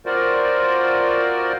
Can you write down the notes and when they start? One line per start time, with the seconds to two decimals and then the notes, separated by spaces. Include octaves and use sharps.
0.06 C4 F4 F#4 A#4 C5 D5